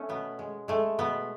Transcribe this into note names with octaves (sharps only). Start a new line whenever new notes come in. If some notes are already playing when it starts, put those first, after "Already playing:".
Already playing: A3 C#4
B2 B3
G#3
G#3 A3
B2 B3